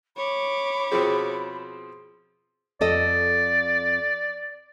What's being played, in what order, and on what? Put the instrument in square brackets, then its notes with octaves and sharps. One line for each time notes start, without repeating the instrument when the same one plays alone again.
[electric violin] C#5 D6 [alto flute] B5
[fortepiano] B2 F3 C4 [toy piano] G#4
[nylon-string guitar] F2 A4 D#5 [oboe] D5